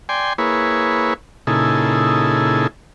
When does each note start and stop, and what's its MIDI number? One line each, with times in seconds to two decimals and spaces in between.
0.09 0.33 74
0.09 0.33 79
0.09 0.33 80
0.09 0.33 84
0.38 1.14 58
0.38 1.14 64
0.38 1.14 68
0.38 1.14 71
0.38 1.14 73
1.47 2.67 46
1.47 2.67 49
1.47 2.67 63
1.47 2.67 64
1.47 2.67 68
1.47 2.67 69